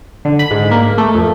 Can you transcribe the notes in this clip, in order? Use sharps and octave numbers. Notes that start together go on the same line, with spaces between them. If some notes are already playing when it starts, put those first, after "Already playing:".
D3
B5
G#2
A#3
A3
F2